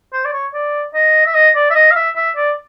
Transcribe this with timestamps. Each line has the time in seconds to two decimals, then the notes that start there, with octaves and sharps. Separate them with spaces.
0.13 C5
0.25 D5
0.33 C#5
0.54 D5
0.94 D#5
1.26 E5
1.35 D#5
1.56 D5
1.70 E5
1.75 D#5
1.91 F5
1.96 E5
2.16 E5
2.37 D5